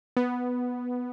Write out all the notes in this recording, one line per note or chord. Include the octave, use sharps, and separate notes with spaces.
B3